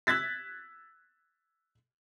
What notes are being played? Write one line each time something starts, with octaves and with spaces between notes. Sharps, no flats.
E6 F#6 G#6 A6 B6